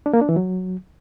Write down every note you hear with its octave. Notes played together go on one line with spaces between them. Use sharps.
D4
A#3
D4
E3
F#3